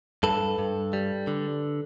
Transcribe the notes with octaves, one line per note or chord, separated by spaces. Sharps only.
G2 A4 B4
G2
G3
D3